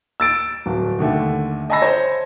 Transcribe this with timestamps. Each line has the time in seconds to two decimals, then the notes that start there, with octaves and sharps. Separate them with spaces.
0.20 E6 A6 D7
0.66 D1
0.99 D#2 D3 A3
1.70 D#5 G#5 A5 B5 E6 A#6
1.82 C5 C#5